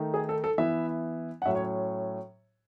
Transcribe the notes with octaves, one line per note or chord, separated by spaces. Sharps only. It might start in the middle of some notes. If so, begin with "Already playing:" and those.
Already playing: D#3 A3 D#4
G#4
A4
A4
E3 B3 E4 E5
F#5
A2 F#3 C#4 E5
C#5